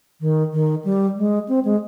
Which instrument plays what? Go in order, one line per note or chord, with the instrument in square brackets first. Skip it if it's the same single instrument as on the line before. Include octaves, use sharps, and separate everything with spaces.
[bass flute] D#3
D#3
G3
G#3
C4
G#3